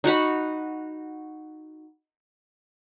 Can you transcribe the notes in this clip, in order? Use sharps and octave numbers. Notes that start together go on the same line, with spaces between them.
D#4 F#4 F#5 B5